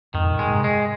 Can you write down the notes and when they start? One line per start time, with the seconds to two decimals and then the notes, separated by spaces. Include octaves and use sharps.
0.14 F2 G#2 D#3
0.25 G#2
0.31 G2 A#2
0.39 G#3
0.48 G#2 C3
0.64 G#3